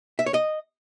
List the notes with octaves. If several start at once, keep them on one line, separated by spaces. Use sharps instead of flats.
E5
C#5
D#5